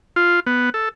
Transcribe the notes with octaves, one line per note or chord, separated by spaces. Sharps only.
F4
B3
A4